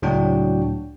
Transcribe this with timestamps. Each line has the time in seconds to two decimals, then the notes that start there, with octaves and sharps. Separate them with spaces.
0.02 C#2 A2 F#3 D4 F#4 G5